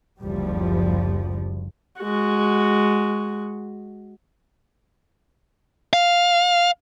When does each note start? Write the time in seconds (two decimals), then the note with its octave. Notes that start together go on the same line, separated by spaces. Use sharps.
0.19 F#1 D2 F3 G3
1.99 G#3 F#4
5.93 F5